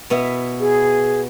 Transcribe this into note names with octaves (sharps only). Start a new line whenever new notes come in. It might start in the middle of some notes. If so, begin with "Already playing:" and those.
B2 B3 E4
G#4